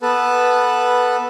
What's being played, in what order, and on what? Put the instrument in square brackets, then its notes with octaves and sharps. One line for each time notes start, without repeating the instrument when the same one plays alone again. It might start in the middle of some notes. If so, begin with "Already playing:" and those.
[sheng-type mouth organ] B3 A4 B4 A5